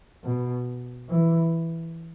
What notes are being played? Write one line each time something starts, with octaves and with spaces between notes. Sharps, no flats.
B2
E3